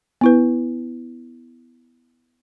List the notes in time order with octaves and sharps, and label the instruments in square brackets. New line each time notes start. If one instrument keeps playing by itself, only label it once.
[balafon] B3 E4 B4